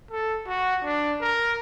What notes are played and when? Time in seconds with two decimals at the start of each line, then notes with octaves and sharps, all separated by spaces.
0.11 A4
0.47 F#4
0.83 D4
1.21 A#4